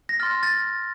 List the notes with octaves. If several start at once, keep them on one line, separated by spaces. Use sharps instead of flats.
A#6
C6 F6 A6
A6